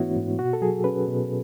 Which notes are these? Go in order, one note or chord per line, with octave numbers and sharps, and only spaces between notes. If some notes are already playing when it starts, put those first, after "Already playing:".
Already playing: G#2 E3 A3 B3 D4 E4 F#4 C#5
G#2
B2 F#4
A4
F#3 G#4
C#4 B4
B2